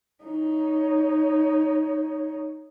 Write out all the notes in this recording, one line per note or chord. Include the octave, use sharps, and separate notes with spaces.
D#4 C#5